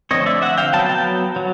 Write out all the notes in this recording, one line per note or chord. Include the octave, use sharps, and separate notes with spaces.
D3 F3 A3 C4 C#5 D#5
D5 E5
E5 F#5
F5 G5
F#3 B3 G5 A5
G5 A5
F#3